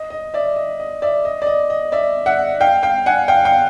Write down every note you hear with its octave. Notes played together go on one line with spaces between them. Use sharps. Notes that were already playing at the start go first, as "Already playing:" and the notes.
Already playing: D#5
D#5
D5 E5
D#5
D#5
D5 E5
D#5
D5
D#5
D#5
D5 E5
E5 F#5
F5 G5
F5 G5
F#5 G#5
F5 G5
F5 G5